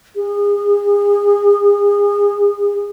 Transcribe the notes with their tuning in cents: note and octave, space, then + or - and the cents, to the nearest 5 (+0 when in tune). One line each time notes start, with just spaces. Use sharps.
G#4 -35